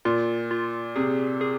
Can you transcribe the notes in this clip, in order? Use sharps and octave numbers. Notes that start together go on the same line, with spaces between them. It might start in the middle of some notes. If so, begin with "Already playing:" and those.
A#2 F4
F4
C3 G#4
G#4